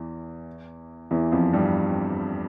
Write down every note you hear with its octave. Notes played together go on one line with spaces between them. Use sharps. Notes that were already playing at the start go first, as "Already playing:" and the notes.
Already playing: E2 E3
E2 E3
F2 F3
G2 G3